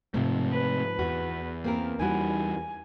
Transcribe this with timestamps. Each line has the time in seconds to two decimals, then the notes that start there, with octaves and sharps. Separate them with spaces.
0.14 G#2 C3 F3 A3
0.51 B4
0.99 E2 F#4
1.64 A#3 C4 A#4
1.99 E2 G3 D#4 E4 F#4 G#5